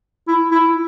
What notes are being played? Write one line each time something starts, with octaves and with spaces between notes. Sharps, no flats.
E4
E4